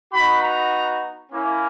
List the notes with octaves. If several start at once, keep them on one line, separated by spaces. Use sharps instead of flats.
B3 D#4 F#4 B5
A#5
A#3 C#4 E4